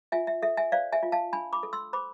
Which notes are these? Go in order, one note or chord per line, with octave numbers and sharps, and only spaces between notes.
F4 E5 G#5
E5
A4 E5
E5 G#5
C5 D5 F5
E5 G#5
F4
F5 A5
D4 G#5 B5
B5 D6
A4
C6 E6
C5 B5 D6